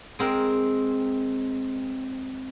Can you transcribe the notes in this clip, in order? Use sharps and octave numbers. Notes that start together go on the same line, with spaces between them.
G#3 C4 A#4